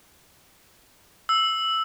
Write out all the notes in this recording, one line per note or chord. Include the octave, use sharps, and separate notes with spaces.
E6